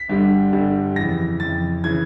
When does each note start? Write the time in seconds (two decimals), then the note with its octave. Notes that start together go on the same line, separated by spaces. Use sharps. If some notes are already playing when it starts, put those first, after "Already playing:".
Already playing: B6
0.09 G1 G2 D3 G3
0.53 G1 G2 D3 G3
0.96 F2 C#3 E3 A#6
1.40 F2 C#3 E3 A6
1.84 C#3 E3 G#6